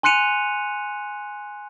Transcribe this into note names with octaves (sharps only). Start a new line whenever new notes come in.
G#5 C6 F#6 C#7 D#7 F7